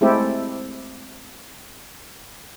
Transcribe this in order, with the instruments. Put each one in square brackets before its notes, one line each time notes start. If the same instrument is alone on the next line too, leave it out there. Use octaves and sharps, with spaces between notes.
[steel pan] G#3 A3 C4 E4 G4 A4